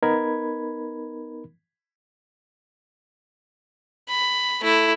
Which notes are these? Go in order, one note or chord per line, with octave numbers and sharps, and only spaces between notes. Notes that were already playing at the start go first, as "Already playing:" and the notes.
B3 D#4 A#4 B5 G#6
B5
A3 E4